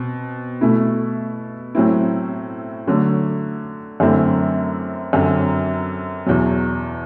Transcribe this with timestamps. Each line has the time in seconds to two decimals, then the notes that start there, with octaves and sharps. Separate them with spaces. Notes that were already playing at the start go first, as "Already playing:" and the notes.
Already playing: B2 C4
0.61 B2 A3 E4
1.75 A2 F#3 C4 E4
2.87 D3 F#3 A3
4.00 F#2 D3 A3 C4 E4
5.13 F#2 D3 F#3 C4
6.26 E2 B2 F#3